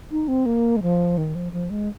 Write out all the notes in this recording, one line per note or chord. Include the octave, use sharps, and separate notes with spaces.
D#4
C4
A#3
G#3
F3
D#3
F3
F3
G#3